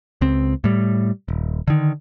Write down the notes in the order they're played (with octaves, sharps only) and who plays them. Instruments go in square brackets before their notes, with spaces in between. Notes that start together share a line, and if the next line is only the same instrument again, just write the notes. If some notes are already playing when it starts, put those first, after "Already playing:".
[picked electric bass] C#2 C4
A2 G3
D#1
D3 D#3